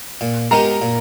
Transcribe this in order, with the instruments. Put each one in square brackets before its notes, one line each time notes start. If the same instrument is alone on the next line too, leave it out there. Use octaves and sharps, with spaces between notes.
[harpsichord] A#2
[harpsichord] G#3 B3 D#4 G4 [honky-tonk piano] A#4 A#5
[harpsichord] A#2